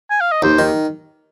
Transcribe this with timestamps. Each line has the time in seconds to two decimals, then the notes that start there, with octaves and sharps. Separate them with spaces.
0.10 G#5
0.21 F5
0.32 D#5
0.42 D#2 C5
0.59 D#3